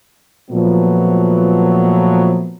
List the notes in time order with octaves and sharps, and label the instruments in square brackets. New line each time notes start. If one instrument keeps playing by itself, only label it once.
[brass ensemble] A#2 F3 F#3 A3 B3